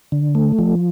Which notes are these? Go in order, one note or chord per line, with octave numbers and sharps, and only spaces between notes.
D3
A3
F3